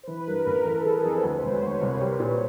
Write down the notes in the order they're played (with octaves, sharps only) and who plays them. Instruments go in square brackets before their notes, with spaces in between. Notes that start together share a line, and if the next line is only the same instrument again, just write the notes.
[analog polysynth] C5
[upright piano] E3 [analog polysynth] B4
[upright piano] G2 [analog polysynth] A#4
[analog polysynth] B4
[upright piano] A1 [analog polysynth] A#4
[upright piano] E3 [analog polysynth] A4
[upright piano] E3 [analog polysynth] G#4
[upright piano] F2 [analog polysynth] A4
[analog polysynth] C5
[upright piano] D2 [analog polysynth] B4
[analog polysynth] C5
[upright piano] E1
[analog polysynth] C#5
[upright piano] D2 [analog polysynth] B4
[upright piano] C2 [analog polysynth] A#4
[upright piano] G3
[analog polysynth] B4
[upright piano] A#2